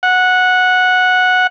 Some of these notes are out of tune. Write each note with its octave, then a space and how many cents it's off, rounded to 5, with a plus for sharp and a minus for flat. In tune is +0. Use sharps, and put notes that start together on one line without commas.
F#5 -10